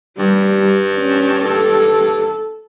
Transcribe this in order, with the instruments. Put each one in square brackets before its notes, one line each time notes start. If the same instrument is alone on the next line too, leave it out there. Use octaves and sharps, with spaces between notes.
[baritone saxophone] G2 [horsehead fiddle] G3
[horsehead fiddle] C#4
A4